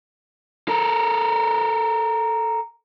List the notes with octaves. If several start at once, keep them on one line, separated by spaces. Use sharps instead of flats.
A4 A#4